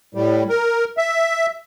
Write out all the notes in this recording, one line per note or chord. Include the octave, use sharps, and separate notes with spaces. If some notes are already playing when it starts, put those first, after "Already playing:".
A2 G3
A#4
E5